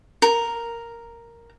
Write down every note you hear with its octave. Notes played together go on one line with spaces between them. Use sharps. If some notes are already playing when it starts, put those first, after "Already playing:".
A#4